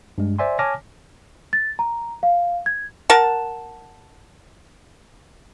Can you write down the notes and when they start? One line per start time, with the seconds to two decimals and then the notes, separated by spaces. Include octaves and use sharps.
0.18 G2 G#3
0.39 C5 D5 E5 G#5 C6
0.59 C#5 G#5 A5 D6 F6 A#6
1.53 A6
1.79 A#5
2.23 F5
2.66 G#6
3.10 A#4 F#5 A5